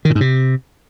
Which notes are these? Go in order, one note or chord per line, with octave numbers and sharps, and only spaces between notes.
D#3
A#2
G#2
C3